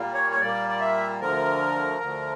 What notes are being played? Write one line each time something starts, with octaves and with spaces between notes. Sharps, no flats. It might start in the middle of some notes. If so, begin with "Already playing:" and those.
Already playing: A#2 G3 A#3
C#5
C#5
A#2 G3 A#3 D5
D5
E5
D2 D3 F3 A#4
D2 D3 F3